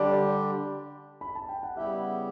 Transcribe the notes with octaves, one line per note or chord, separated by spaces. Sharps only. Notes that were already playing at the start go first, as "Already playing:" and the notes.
Already playing: D3 G3 D4 G4 D5
B5
A5
G5
F#5
C#3 G3 B3 E4 G4 E5